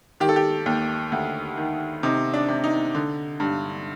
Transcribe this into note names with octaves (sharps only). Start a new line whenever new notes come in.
D#3 G4
A4
G4
D#2
D2
D#3
C3 D#4
D4
C3
D#4
D3
G2